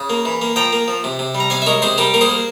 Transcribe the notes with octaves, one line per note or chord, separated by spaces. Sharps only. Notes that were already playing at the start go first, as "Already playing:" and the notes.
Already playing: C#3
A#3
E3
A#3
F3 G5 A#5
A#3
F3
C3
C3
G3
A#5
C3 F5 G#5
E5
G#3 A#4 C#5
C3 G#4 C5
G3 G4 A#4
A#3 A#4
G#4 C5
A#3